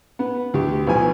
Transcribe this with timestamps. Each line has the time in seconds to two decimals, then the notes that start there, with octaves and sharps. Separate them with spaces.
0.19 B3
0.54 D2 G4
0.87 B1 F3 G#5